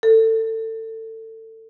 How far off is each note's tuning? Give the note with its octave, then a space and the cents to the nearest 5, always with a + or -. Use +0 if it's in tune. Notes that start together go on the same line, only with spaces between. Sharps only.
A4 +25